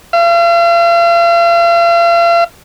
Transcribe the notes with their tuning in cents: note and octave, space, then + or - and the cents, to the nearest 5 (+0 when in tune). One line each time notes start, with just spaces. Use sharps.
F5 -40